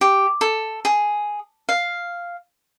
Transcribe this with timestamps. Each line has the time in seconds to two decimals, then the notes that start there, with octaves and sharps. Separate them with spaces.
0.01 G4
0.41 A4
0.85 G#4
1.69 F5